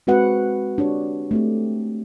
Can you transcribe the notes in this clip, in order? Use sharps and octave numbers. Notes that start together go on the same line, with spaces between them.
G#3 C4 F#4 B4 F#5
D4 G4 C#5
A3 C4 G4